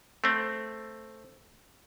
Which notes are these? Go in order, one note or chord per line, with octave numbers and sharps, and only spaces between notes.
A3 C4